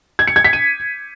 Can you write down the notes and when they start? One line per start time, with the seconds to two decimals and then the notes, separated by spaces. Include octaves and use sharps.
0.19 G#6
0.27 C#7
0.36 G#6
0.44 B6
0.53 D#7